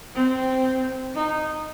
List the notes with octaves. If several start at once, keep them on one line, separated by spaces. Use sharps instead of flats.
C4
D#4